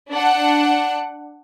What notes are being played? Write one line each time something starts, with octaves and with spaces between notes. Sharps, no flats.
D4 F#5